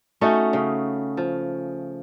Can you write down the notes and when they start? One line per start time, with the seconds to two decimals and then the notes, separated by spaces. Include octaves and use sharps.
0.21 A3 C#4 D#4 F#4
0.53 C#3
1.17 F3